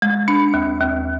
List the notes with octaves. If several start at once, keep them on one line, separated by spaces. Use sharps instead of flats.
G#3
D4
D#2
D#2